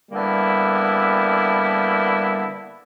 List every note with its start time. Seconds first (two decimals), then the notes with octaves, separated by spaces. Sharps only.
0.12 D3 G3 A#3 B3 E4